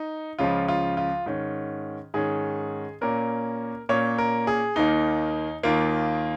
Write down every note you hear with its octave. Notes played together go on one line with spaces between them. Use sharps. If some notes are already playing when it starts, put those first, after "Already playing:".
Already playing: D#4
C#2 C#3 F3 F4
F4
F4
G#2 D#3 C#4
G#2 D#3 C#4 G#4
A#2 A#3 C#4 A#4
A#2 A#3 C#4 C#5
A#4
G#4
D#2 D#3 A#3 D#4
D#2 D#3 A#3 F4